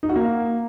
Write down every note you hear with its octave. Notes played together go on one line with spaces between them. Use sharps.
D#4
F#4
A#3